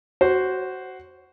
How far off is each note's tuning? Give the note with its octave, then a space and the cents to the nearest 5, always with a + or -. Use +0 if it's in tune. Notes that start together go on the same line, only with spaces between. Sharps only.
F#4 +10 C5 +0